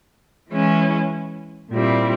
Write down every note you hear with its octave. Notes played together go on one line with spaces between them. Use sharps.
E3 G#3 C#4 E4
A#2 G3 C4 E4